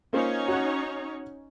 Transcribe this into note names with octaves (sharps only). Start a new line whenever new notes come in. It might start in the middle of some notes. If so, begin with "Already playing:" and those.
A#3 C#4 D#4 F4 C5 C#5
F#4 F#5